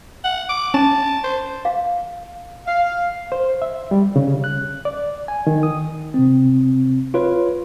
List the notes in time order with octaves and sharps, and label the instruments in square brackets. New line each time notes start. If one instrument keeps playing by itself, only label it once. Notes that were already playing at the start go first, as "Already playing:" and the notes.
[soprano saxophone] F#5
D6
[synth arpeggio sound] C#4 [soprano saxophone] A5
[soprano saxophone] C5
[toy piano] F5
[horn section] F5
[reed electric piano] C5
E5
G3
C#3
F#6
D5
G#5
D#3
D#6
[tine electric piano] C3 C4
F4 B4 C#5